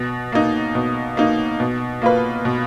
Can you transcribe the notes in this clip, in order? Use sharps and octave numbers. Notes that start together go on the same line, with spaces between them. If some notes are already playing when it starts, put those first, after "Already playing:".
Already playing: B2
A#3 D#4
B2
A#3 D#4
B2
A#3 F4 B4
B2